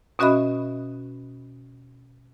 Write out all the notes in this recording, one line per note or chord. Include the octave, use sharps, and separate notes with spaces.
B2 C#4 F#4 D#5 E5 B5